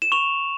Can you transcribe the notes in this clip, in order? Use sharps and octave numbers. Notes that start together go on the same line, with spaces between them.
E7
C#6 F7